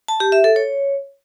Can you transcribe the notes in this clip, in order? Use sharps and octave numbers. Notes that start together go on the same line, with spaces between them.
A5
G4
E5
A4
C#5